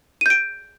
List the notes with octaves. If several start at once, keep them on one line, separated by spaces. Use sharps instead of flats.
G6 D7 D#7